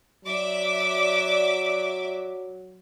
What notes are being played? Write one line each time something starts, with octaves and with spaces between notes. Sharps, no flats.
F#3 D5 E5 D6